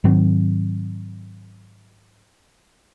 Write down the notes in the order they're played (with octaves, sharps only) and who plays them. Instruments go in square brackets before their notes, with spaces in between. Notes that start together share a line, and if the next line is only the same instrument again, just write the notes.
[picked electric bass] G#2 D#3 F#3 C4